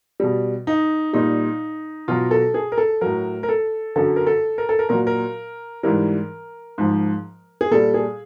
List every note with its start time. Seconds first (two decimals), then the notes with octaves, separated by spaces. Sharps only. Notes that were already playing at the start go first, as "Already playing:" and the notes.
0.20 B2 G3
0.67 D#4
1.13 A#2 G3 D#4
2.08 B2 F#3 F4
2.31 A4
2.54 G#4
2.72 A#4
2.78 A4
3.01 A2 F#3 A#4
3.43 A#4
3.49 A4
3.96 F#2 D3 F#3 A4
4.16 A#4
4.27 A4
4.58 A#4
4.69 A4
4.79 A#4
4.89 A#2 F#3 A#4
5.07 A#4
5.83 G#2 E3 G3 A#4
6.78 G#2 F3
7.61 G#4
7.71 A#2 G3 A4
7.94 G#4